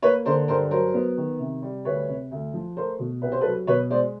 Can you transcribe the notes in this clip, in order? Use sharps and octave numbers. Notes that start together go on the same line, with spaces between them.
A#3 B4 C#5
D3 A#4 C5
G2 A#4 C5
F#3 A#4 C5
B3
D#3
C3
G3
D2 B4 C#5
C3
D2
F3
A3 A#4 C5
B2
C2 B4
C5
A4 B4
F#3
B2 B4 C#5
G#3 C5 D5